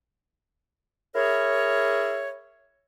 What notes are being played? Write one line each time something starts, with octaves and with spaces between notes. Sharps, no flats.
E4 G#4 A#4 C#5